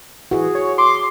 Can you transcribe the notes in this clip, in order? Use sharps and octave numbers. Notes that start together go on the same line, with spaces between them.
E3 F#4 G#4
C#5
C6 D6